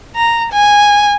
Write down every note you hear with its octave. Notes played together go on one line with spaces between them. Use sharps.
A#5
G#5